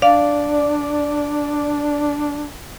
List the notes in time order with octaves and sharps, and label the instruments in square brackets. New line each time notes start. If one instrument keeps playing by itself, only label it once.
[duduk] D4 [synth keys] D5 [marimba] F5